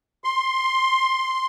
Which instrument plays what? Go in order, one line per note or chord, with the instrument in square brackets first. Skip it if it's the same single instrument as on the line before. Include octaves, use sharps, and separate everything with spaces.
[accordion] C6